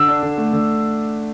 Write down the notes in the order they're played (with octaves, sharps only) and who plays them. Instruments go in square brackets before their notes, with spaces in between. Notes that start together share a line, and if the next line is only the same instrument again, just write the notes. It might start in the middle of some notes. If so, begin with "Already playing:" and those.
Already playing: [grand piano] D3 E6
D4
D3
A3
D3